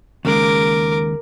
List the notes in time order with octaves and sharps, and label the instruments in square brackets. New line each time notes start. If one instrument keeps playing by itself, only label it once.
[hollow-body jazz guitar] D#2 C#3 G#3 [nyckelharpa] A#4 D6